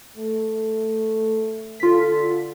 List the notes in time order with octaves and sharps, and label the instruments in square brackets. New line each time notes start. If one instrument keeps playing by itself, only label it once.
[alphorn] A3
[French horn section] D3 A4 [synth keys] F4 B6